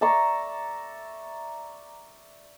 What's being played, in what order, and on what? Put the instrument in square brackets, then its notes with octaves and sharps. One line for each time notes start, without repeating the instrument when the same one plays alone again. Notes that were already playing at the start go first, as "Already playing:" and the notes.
[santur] D5 E5 A#5 C#6